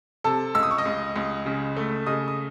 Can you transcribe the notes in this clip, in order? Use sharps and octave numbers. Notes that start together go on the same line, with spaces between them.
C3 A4 A5
C#2 E6
D#6
C#6
D#5 D#6
C#2
C#2
C#3
A3
C#3 D#5 D#6
D#6